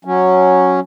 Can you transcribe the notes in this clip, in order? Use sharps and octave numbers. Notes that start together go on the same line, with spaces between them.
F#3 C#4